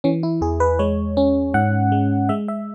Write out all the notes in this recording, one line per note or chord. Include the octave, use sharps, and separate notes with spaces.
E3 C#4
E4
E2 G#4
B4
G#3 C#5
C#4
G#2 F#5
G#3
G#3 E5
E5